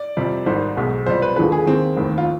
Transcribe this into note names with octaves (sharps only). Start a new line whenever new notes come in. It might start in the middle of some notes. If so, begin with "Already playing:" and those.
Already playing: D5
F2 C3 G3
G#1 G#2 D#3 G3 C5
B1 B2 G#3
F2 C3 G3 C5
B4
D#2 D3 F3 G#3 B4
G#4
D#2 D#3 G#3 C4
F1 D#2 D#3
F4